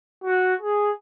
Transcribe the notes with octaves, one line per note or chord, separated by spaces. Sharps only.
F#4
G#4